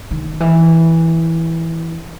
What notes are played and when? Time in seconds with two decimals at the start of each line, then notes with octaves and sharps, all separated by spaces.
0.11 D#3
0.40 E3